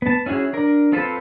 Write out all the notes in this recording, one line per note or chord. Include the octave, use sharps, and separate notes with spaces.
B3 A5
C#4 E4 F#4 G#4 C#5
D4 A#4
C4 F4 A4 B4 C5